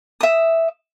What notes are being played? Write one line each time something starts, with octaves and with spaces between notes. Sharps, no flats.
E5 D#6